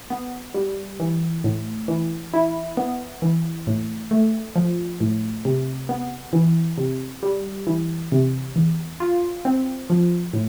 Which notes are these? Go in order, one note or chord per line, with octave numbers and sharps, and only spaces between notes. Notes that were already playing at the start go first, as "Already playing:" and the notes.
B3
G3
E3
A2
E3
E4
B3
E3
A2
A3
F3
A2
C3
B3
E3
C3
G3
E3
C3
E2
F4
C4
F3
A2